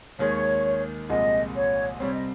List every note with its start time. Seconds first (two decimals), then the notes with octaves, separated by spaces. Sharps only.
0.19 D#2 D#3 G#3 C#5
1.09 C2 A#2 F3 G#3 D#5
1.55 C#5
2.00 C3 G3 C4 C#5
2.13 D#5